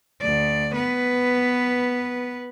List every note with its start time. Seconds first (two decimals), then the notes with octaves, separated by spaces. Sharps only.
0.22 D2 D5
0.74 B3 B4